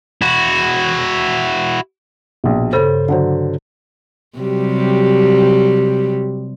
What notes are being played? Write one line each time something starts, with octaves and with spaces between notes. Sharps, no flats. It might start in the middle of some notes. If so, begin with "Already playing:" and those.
E4 F#4
A#1 B2
G2 C#3 A4 C5
D3 F#3 C5
C3 F#3 G3